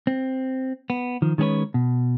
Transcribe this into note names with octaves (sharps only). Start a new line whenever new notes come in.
C4
B3
D#3 F3
D#3 G#3 C#4 G#4 B4 C#5
B2